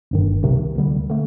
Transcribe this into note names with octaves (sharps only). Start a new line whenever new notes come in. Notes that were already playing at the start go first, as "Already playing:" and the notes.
G1 G2 D#3
C2 C3 D#3
D2 D3 G3
D3 A3